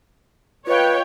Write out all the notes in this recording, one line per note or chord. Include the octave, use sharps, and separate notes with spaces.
F4 B4 C#5 D#5 F5 G5